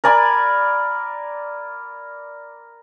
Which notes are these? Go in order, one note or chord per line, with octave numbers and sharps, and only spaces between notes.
A#4 D5 G#5 B5